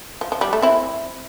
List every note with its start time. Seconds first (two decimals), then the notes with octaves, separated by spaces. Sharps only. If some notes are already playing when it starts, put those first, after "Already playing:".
0.21 F3
0.32 F3
0.41 G3
0.53 A3
0.62 C4 E4